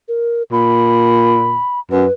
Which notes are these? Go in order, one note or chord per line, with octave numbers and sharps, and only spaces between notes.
A#4
A#2 B5
F#2 B4